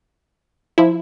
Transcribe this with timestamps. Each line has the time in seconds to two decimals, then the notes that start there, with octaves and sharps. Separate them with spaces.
0.78 F3 E4